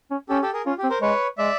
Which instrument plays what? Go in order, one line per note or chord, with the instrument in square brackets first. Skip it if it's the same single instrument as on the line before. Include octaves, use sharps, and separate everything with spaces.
[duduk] C#4
[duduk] C#4 [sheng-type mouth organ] G4 A4
[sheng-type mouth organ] G4 A4
G#4 A#4
[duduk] C#4 [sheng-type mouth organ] F4
[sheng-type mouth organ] G4
[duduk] C4
[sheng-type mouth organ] A#4 C5
[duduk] G#3 [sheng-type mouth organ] B4 C#5
[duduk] G#3 [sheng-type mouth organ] D5 E5